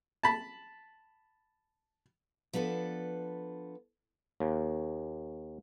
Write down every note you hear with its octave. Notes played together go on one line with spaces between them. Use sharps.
A5 B5
F3 B3 D4 A4 B4
D#2